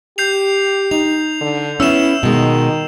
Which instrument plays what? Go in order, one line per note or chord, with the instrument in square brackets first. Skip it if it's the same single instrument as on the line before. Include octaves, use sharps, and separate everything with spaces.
[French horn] G4 [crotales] G6 C7 F7
[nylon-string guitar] D#4 [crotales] F7
[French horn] D3
[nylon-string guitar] B3 C#4 [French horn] E4 [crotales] E6 E7
[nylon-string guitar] B2 G#3 [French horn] D#3